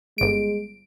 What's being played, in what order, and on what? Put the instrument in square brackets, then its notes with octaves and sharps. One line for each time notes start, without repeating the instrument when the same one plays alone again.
[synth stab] G1 D7 [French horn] G#3